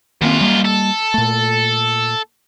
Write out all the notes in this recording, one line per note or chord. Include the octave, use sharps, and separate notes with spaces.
F#2 D#3 A#3 C4 F4
G3 A#3
A4
A#2 A3